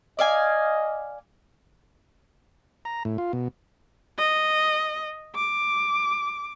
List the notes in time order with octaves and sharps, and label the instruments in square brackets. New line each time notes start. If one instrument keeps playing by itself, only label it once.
[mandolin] D5 F5 G#5 [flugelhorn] D#5
[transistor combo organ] A#5
A2
F4
B2
[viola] D#5
D6